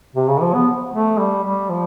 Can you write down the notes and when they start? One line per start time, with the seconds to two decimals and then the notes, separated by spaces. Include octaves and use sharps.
0.16 C3
0.28 C#3
0.41 F3
0.54 B3
0.92 A3
1.18 G3
1.44 G3
1.69 F3